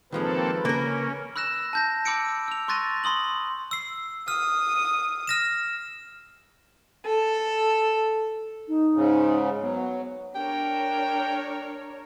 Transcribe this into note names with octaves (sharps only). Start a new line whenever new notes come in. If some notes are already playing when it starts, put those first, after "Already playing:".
D#3 F3 G#3 A#3 C4 A4 B4
C#3 A#3 C#4 A#4
B5 E6 F#6 A#6 E7
A5 G6 A#6
B5 D6 E6 G6 C#7 D7
E6 F7
C6 C#6 F#6 A6 A#6 D#7
B5 C6 D#6 F#7
E6 C7
D#6 F6
F6 A#6 E7
A4
D#4
G#2 C#3
F#3 B3
D4 A#4 C#5 G5